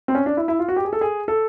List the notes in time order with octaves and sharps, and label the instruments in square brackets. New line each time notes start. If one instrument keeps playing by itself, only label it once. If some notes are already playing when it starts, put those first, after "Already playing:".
[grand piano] C4
C#4
D4
E4
E4
F4
F#4
G4
G#4
A4
G#4
A4